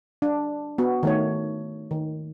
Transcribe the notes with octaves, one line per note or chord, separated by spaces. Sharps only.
D4
B3 F#4
D#3 A3 C#5
D#3